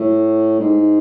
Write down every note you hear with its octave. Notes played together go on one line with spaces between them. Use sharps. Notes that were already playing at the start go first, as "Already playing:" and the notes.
Already playing: A2
G#2